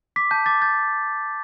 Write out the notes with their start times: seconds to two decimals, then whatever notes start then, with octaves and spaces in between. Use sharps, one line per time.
0.16 D6 B6
0.31 A5 G6
0.46 D6 A6
0.62 G6 A6